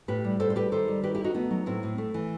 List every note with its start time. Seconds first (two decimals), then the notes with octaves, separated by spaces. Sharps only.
0.08 A2 G4 B4
0.24 G3
0.40 A2 A4 C5
0.50 C5
0.56 G3 G4 B4
0.72 D#3 A4 C5
0.88 G3
1.03 D#3 G4 B4
1.15 E4 G4
1.19 G3
1.24 D#4 F#4
1.34 A3 B3 D#4
1.51 F#3
1.66 A2 C4 E4
1.83 A2
1.98 A3
2.14 E3